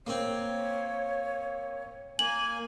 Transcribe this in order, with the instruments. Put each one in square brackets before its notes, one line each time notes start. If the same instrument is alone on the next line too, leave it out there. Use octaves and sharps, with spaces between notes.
[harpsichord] A#3 C4 [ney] C#5
[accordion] A#3 G#5 [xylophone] F#7